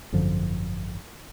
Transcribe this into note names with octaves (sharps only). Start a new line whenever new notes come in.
G#1 F#2 D3 F3